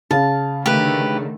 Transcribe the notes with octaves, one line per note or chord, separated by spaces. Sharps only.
C#3 F5 A5
D3 D#3 A3 G4 B4